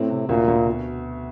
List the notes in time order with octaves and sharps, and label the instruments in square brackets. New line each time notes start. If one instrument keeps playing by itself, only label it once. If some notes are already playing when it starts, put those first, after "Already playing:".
Already playing: [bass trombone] A2 [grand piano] C4
[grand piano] C3
[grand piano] D2 [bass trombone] A#2
[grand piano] D2
B2